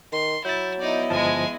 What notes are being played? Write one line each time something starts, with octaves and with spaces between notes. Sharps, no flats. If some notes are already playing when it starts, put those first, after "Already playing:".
D#3 C6
F#3 E4 G6 A6
B3 D#4 E4 D5 D#5
G1 F3 G#3 G#5 A5